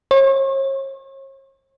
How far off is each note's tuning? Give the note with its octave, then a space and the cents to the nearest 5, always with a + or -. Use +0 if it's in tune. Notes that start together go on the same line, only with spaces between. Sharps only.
C#5 -40